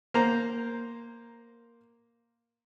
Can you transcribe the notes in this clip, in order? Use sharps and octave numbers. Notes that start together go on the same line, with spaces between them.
A#3 C5 A#5